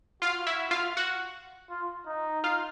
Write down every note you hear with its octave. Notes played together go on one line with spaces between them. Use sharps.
F4 F#4 F5
E4 E5
F4 F5
F#4 F#5
F4
D#4
F4 F5